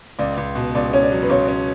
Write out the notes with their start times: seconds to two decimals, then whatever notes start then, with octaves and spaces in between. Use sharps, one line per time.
0.19 C#2 D5
0.37 C#2
0.55 B2
0.75 C#2 D5
0.93 C#4 C#5
1.03 D5
1.11 F#3
1.23 B4
1.29 C#2 C#5
1.48 C#4